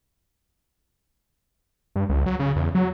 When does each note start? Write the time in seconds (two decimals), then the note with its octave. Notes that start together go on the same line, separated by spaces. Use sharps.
1.96 G2
2.09 C#2
2.26 F#3
2.40 C#3
2.56 E2
2.75 F#3